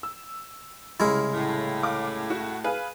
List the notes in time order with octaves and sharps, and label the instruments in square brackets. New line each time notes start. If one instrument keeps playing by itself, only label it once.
[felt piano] E6
[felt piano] C2 C#3 [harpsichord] G#3 E4 [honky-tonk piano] F6
[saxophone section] A2
[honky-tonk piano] F5 D6
F#4
G#4 B4 F5